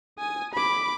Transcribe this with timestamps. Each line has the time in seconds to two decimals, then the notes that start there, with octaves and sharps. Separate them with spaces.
0.19 G#5 D#6
0.54 B5 D6